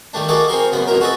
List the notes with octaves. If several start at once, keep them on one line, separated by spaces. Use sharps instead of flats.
D#3 G3 A3 D4
A#3 F#4 G#4 A4 D5 D#5
C4 G#4 A#4 C6 C#6
F#2 C#3 B3 B5
F2 B2 E4 A#4
F#4 G#4 A4 B4 D#5 E5